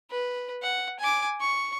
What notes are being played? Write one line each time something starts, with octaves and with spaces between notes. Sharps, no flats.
B4
F#5
G#5 D6
C#6